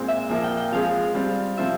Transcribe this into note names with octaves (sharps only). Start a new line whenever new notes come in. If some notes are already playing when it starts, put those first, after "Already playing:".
Already playing: A#2 G#3 C4
E5
A#2 F3 A#3 E5
G5
G5
F3 G#3 C4 F4 G#4 F5
G3 C4 F4
C3 F3 C4 F4 E5